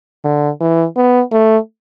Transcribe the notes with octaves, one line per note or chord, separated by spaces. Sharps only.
D3
E3
B3
A3